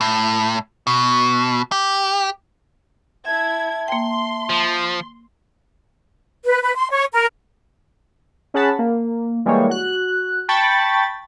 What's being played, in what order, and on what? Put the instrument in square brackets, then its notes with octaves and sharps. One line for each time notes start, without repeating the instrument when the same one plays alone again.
[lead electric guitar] A2
B2
G4
[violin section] E4 G#6 [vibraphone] E5 A5
[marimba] A#3 G5 [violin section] C6
[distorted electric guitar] F3
[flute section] B4
B4
C6
C#5
A#4
[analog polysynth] C#4 G#4 F#5 A5 B5
A#3
E3 G3 G#3 A#3 C#5
F#4 F#6
G5 A5 B5 C#6 A6